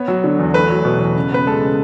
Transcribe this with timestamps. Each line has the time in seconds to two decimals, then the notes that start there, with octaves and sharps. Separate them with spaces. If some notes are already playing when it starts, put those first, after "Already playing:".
Already playing: B3 C#5
0.08 F#3
0.24 D3
0.39 E2
0.54 A3 B4
0.70 F#3
0.85 B2
1.01 E2
1.15 C#3
1.32 B3 B4
1.46 G#3 A4
1.61 C#3